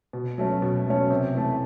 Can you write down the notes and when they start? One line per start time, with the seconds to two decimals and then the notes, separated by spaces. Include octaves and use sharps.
0.13 B2
0.38 F#3 A3 C#4
0.62 B2
0.86 F#3 A3 C#4
1.10 C3
1.35 E3 A3